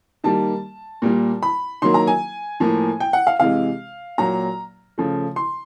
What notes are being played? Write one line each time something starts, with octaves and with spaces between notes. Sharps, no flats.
D#3 G3 A#3 A5
A#2 G3 A#3
B5
D#3 F#3 A#3 C6
A#5
G#5
A2 F3 A#3
G5
F#5
F5
C3 E3 G#3 F5
A#2 F#3 A#3 A#5
C#3 F3 A3
C6